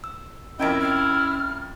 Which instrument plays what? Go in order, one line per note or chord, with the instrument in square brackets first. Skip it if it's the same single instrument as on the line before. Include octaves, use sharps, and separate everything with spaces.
[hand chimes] E6
[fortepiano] F2 A#4 G5 [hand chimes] C#4 G#6 D7 [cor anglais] E4 [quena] D#5
[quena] F6